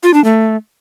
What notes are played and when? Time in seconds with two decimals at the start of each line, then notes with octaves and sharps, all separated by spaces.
0.03 F4
0.14 D4
0.24 A3